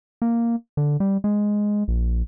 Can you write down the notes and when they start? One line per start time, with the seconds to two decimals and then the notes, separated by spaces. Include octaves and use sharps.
0.22 A#3
0.77 D3
1.00 G3
1.24 G#3
1.88 A#1